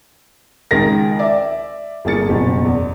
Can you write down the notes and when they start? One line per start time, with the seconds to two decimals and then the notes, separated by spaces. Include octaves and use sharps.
0.71 C#2 D#3 G#4 A#4 A6 A#6
1.19 D5 E5
2.05 G1 A#3 G#4 A6 C#7
2.29 F#1 B2
2.65 E2